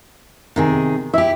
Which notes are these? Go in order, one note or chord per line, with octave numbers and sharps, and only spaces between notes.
C3 D#3 G#4
E4 G4 E5